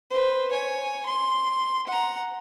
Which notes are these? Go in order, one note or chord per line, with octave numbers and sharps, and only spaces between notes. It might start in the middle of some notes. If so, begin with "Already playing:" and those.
B4 C5
C#5 G#5
C6
F#5 A#5